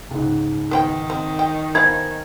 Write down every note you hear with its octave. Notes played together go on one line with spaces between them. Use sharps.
C#2 G#2
D#3 B3 C5 G5
C4
G5
B3 E4 F4 A#4 C5 G#5 G#6